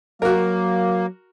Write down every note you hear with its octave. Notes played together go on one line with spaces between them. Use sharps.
F#3 A#3 F#4 A#4